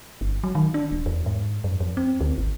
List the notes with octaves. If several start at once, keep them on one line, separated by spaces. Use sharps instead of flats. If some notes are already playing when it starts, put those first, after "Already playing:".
G1
F#3
D#3
D4
D1
E2
G#2
F#2
F2
C4
D2
G#1